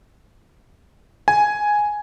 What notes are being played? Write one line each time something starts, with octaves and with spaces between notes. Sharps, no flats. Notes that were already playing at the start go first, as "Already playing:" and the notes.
G#5